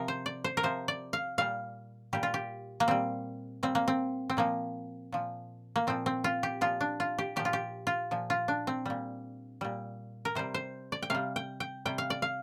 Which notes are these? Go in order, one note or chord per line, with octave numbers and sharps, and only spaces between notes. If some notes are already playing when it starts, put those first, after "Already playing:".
Already playing: C3 F3 A#4
C5
D5
C5
A#4
C3 F3 C5
D5
F5
A#2 G3 F5
A#2 G3 G4
F4
G4
A#3
A#2 G3 C4
A#2 G3 C4
A#3
C4
C4
A#2 F3 A#3
A#2 F3
A#3
A#2 F3 C4
C4
F4
G4
A#2 F3 F4
D4
F4
G4
A#2 F3 G4
F4
G4
F4
A#2 F3
F4
D4
C4
A#2 G3
A#2 G3
A#4
C3 G3 C5
C5
D5
G5
C3 G3 F5
G5
G5
C3 G3 G5
F5
D5
F5